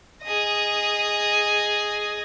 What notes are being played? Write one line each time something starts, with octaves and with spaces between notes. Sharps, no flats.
G#4 D#5